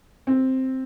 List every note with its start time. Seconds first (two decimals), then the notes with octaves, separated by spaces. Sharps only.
0.27 C4